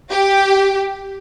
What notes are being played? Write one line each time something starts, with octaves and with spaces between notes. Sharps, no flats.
G4